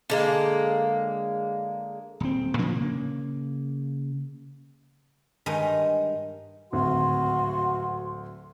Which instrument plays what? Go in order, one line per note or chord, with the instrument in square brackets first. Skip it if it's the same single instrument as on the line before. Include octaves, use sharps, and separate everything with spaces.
[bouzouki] D3 G#3 A#3
[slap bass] D#1 C4
A2 F3 A#3 D4
C#3 A#3
[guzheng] G2 D#3 G#3 D#4 D#5
[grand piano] D1 G#1 D2 [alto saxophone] F#4 [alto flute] C6